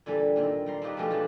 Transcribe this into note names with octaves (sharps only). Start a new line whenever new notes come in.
A#2 D3 E3 G3 A4
A#2 D#3 C4
G3 A#5 C6
C4 D4 D#4 F4 G4 B4
B2 F3 G#3 A3 G4 A4
E3 F4 G4 F5 F#5 A5